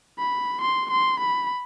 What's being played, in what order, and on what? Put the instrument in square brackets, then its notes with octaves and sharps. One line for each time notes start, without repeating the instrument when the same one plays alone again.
[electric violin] B5
C6
C6
B5